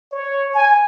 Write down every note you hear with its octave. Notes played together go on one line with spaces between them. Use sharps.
C#5
G#5